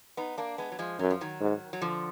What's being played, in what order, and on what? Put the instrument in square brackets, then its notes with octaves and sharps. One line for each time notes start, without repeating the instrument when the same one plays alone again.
[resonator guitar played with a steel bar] B3 D#4
A#3 D4
G#3 B3
F#3
F3 G#3
[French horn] F#2 [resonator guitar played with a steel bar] F#3
[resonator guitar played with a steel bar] F3
D#3 F#3
[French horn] G#2
[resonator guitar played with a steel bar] F#3
D3 F3